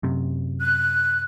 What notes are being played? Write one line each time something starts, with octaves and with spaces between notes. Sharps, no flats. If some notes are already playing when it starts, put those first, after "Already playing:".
F#2 C3
F#6